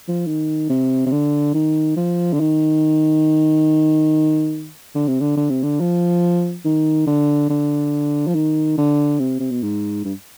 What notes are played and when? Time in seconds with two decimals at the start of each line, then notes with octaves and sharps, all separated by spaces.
0.08 F3
0.27 D#3
0.69 C3
1.06 C3
1.12 D3
1.54 D#3
1.96 F3
2.33 D3
2.40 D#3
4.95 D3
5.08 C3
5.20 D3
5.37 D3
5.50 C3
5.63 D3
5.80 F3
6.65 D#3
7.07 D3
7.50 D3
8.27 F3
8.35 D#3
8.78 D3
9.19 C3
9.40 C3
9.51 B2
9.63 G#2
10.05 G2